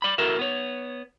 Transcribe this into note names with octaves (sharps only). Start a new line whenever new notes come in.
D5 B5
E4 F#4 A4 A#4 E5
B3 C#5